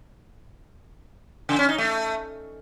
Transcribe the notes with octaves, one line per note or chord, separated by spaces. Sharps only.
C#3
C#4
D#4
A3